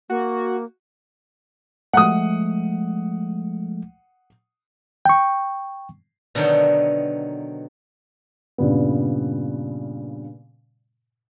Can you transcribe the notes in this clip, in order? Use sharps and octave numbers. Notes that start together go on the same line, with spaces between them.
A#3 F#4
F3 G#3 A3 F#5 D#6
G5 C#6
B2 D3 D#3 F#3 D#5 G5
G2 A#2 C#3 G3 B3